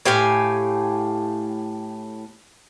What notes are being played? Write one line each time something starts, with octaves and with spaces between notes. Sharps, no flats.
A2 G4 F5 G#5